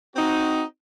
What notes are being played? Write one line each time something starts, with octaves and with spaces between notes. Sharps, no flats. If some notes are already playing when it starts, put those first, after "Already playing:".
C4 D#4 F#4